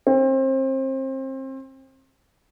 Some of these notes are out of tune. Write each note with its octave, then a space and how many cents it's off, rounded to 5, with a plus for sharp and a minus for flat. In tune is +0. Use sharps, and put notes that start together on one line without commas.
C4 +30